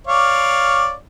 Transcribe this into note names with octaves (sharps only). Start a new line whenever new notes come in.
C#5 D5 F5